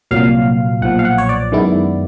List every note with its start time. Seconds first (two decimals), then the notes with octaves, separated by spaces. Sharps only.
0.11 C2 A#2 F#3 F5
0.82 B1 A#2 F3 F#5
0.99 F5
1.05 F#5
1.18 C#5
1.29 D5
1.52 F#2 D#3 G#3 B3 E4